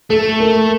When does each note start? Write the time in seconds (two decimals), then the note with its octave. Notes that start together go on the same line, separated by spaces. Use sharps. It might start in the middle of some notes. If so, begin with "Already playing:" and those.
0.10 A3 A4
0.40 A#4